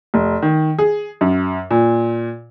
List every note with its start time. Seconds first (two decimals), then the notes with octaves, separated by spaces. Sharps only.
0.14 F1
0.42 D#3
0.79 G#4
1.21 F#2
1.71 A#2